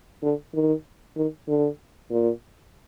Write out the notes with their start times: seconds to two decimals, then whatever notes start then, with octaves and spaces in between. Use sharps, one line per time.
0.23 D3
0.54 D#3
1.16 D#3
1.48 D3
2.11 A#2